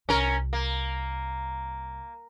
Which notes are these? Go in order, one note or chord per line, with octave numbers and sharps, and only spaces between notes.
C2 C#4 A#4
A#3